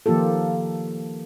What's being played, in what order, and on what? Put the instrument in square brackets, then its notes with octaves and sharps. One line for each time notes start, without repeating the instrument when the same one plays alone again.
[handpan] D#3 F3 A#3 F4 G4 A4